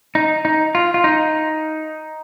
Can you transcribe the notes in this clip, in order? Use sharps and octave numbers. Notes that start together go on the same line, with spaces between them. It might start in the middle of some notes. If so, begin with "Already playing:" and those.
D#4
D#4
F4
F4
D#4